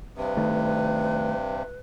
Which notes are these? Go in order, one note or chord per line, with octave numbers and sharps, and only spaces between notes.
G2 C3 B4
D#3 A3